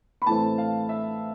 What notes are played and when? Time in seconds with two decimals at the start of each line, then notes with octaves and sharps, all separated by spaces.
0.22 B5
0.26 A2 E3 A3 C4 A5
0.58 F5
0.89 E5